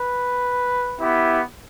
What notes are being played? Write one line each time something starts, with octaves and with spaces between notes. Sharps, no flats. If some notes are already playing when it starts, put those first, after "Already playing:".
Already playing: B4
B3 E4 G4